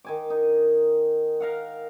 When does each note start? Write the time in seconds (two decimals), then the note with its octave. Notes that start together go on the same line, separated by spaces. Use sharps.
0.04 D#3 G#5 D6
0.30 D#4
1.40 A#4 F5 F#5